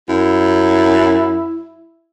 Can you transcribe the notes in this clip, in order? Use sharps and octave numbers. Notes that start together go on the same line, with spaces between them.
F#2 E4